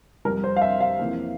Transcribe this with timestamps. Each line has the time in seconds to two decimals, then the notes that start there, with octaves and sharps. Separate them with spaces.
0.25 F2 C3 G3 A#4
0.44 C5
0.56 F5
0.62 E5
0.81 F5
0.99 F2 E3 A#3